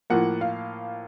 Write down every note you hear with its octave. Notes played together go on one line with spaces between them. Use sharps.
A2 F3 A#3 F#5
F5